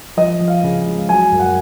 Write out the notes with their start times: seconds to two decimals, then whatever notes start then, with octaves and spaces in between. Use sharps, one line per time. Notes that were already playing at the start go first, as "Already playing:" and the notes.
0.17 F3 D#5
0.41 F3
0.48 F5
0.64 C#3
0.86 G#3
1.09 F#3 G#5
1.32 F#2
1.39 F#5